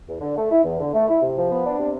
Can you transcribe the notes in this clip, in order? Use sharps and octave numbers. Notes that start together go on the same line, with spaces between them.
E2
D3
A3
E4
E2
D3
A3
E4
C3
F3
B3
D4
C3